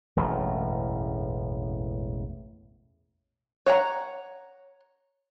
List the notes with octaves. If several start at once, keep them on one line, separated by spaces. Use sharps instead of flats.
E1 A1 F#2 A2
C#5 F#5 G5 A#5